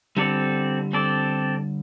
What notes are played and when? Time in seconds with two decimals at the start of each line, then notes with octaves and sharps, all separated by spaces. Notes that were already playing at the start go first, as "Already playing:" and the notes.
0.17 D3 G3 C4 A4 D5
0.93 C4 A4 D5